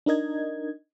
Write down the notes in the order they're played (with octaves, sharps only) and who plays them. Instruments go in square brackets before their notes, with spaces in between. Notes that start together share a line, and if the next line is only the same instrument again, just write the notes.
[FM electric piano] D4 D#4 A#4 D#5 G#6